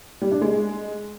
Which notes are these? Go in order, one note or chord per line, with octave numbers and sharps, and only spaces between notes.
G3
D4
G#3